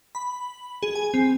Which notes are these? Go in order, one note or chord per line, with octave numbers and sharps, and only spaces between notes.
B5
G#4
G#5
C4